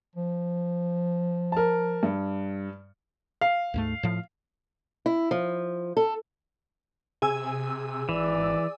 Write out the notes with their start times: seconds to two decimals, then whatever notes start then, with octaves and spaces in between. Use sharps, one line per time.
0.16 F3
1.52 A#4 A5
2.03 G2
3.41 F5
3.74 D2 G#2 A3
4.03 A2 F3
5.06 E4
5.31 F3
5.97 A4
7.22 C3 G#4 G#5 E6
8.09 G#1 E3 D5